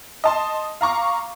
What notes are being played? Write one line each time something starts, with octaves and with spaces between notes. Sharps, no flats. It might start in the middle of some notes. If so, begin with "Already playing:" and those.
D#5 A5 C6
F5 A#5 C#6 D6